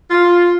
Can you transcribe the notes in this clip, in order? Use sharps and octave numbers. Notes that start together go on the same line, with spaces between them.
F4